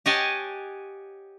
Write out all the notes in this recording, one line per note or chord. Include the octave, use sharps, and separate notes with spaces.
G4 C#5 D#5 F#5 G#5 A5